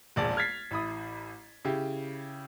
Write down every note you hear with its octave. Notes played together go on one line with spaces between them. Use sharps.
E1 A#1 D5 A5
F6 G#6 A6 B6 C7
A1 E4 B5 D#6
C#3 E4 G4